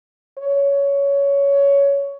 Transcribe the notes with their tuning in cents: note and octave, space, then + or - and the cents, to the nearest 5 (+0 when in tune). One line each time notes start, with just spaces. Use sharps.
C#5 +15